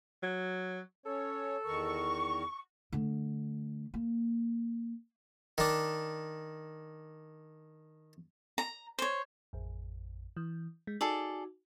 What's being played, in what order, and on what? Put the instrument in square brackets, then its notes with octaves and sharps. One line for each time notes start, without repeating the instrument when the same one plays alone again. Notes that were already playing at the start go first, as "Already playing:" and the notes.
[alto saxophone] F#3
[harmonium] C#4 C#5 [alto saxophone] A4
[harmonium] E2 D#3 A#4 [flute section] C#6
[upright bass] D3 A3
A#3
[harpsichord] D#3 D4
[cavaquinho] A#5
C5 C#5
[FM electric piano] A1 F2
E3
G#3
[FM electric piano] D#4 F#4 [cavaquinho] G#4 A4 D5